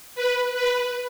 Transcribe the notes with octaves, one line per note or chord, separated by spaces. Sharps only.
B4
B4